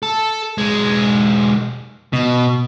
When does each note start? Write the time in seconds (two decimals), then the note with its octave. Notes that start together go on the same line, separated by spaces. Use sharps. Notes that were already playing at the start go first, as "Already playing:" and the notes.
0.03 A4
0.58 B1 G#3
2.13 B2